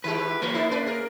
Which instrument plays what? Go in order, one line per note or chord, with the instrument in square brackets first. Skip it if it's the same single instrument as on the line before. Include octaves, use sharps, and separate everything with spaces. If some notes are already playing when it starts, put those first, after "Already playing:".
[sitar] D#3 G#3 G4 [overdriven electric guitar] B4
[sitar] E3 B4 C#5 [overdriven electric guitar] A#3
[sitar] B3 D#4 E4
C#4 B4 D5
G#4 A#4